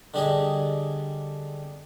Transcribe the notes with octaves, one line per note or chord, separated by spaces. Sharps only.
D3 G3 D4 G4 G#4 D#5